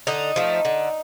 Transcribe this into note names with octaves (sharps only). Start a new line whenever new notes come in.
D3 D#4
F3 A3
D3